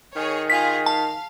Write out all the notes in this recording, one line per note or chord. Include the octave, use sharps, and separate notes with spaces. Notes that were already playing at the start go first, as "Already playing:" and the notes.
D#3 G#4 C#5
F4 G#4 F5 B6
F5 A5